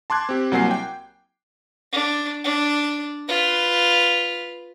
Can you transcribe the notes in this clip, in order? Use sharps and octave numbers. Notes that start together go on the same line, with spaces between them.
A5 C6 D6 F#6 G#6
C4 G4
C2 F#3 A#3 F#5 G#5 C7
G5
D4
D4
F4 B4